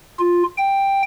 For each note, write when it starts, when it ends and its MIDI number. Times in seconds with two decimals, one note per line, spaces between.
0.19 0.43 65
0.58 1.02 79